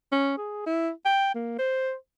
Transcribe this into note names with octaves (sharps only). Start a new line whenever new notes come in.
C#4
G#4
E4
G5
A#3
C5